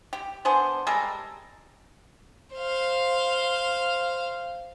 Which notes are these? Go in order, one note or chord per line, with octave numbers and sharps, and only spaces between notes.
G4
B3 D4 G#4 C5
G3 G#3 A4 A#4
C5 F5